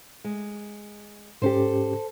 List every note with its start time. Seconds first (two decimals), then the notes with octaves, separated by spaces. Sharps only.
0.24 G#3
1.42 G#2 C#4 G4 A4 C5